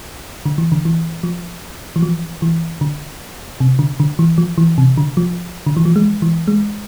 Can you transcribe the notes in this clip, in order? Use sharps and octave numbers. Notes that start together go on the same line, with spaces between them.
D3
E3
D3
E3
F3
E3
F3
E3
D3
C3
D3
D3
E3
F3
E3
C3
D3
F3
D3
E3
F3
G#3
E3
G#3